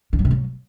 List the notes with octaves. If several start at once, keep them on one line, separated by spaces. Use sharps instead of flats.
D#3
F#3
C3
F#3